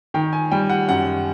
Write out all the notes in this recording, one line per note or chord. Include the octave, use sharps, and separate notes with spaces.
D#3 G5
G#5
G3 G5
F#5
F#2 F#5